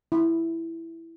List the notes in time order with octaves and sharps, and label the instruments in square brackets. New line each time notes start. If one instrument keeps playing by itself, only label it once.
[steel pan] E4